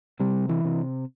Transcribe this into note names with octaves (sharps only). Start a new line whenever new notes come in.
C3 G3
E3
C3